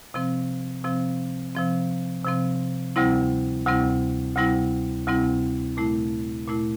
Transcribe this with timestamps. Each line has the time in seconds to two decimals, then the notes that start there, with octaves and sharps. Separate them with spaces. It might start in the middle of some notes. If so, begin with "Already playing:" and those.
0.14 C3 F3 C4
0.84 C3 F3 C4
1.55 C3 F3 C4
2.25 C3 F3 C4
2.96 D2 C3 G3 C4 E4
3.66 D2 C3 G3 C4 E4
4.36 D2 C3 G3 C4 E4
5.07 D2 C3 G3 C4 E4
5.77 A#2 A3 E4
6.47 A#2 A3 E4